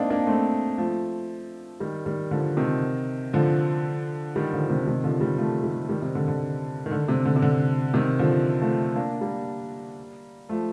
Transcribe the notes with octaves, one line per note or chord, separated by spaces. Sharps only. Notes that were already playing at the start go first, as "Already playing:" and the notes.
Already playing: A#3 C4 D4 D#4
A#3 D4
A3 C4
F3 A3
D#3 G3
D#3 G3
D3 F3
C3 D#3
D3 F3
D#3 G3
D3 F3
C3 D#3
C3 D#3
D3 F3
D#3 G3
F3 A3
D#3 G3
D#3 G3
C3 D#3
D3
D3
D#3
D3
C3
D3
C3
D3
C3 D#3
D3 F3
F3 A3
A#3 D4
G3 A#3
F3 A3